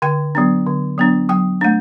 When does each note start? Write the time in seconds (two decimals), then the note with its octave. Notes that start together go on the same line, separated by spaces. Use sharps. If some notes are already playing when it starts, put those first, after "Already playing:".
0.02 D3 G5
0.35 F#3 B3 D4
0.67 D3
0.98 F#3 B3 D4
1.29 F#3 G5
1.61 A3 D4